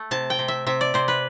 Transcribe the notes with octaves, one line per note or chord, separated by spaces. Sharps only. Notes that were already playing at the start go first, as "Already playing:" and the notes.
Already playing: A3
C3 A5
G5
C3
E5
C3 E5
D5
C3 C5
B4